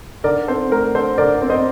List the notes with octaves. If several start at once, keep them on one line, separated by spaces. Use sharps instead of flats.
D3 A#4 D5
C4 A4 C5
A3 A#4
D3 A4 C5
D3 A#4 D5
C4
C5 D#5